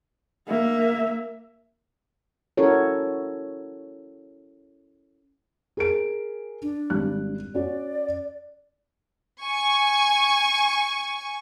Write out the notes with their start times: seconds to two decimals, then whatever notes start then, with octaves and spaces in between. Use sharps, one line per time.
0.47 A#3 E5
2.57 C#4 E4 F#4 A4 A#4 C#5
5.77 G#4 A#4 D7
6.62 D4
6.90 G#1 G3 F#6
7.55 C#4 F#4 D5
9.42 G#5 C#6